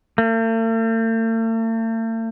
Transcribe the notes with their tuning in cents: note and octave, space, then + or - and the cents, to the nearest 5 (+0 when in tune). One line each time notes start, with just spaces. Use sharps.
A3 +45